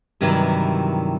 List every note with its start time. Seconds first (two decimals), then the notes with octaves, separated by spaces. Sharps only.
0.21 G2 C3 D#3 E3 F#3 B4